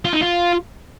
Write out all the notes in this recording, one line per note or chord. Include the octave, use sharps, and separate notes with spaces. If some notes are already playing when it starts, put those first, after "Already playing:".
F4
D#4
F4